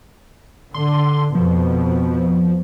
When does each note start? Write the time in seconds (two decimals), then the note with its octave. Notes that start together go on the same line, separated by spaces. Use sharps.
0.74 D3 C6
1.35 F2 B2 F3